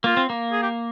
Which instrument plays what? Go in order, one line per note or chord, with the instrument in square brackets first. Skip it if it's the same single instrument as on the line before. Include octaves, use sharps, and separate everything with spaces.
[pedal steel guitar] A#3 [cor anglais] F4
[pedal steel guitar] C4
A#3
[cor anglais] G#4
G4